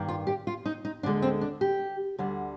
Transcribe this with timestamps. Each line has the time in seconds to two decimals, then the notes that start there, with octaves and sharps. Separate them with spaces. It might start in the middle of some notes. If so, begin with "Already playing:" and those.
Already playing: G2 D#3 A#3
0.09 F4
0.27 G4
0.47 F4
0.65 D#4
0.85 D#4
1.03 D2 D3 G#3 D4
1.22 C4
1.41 D4
1.61 G4
2.18 D2 D3 G3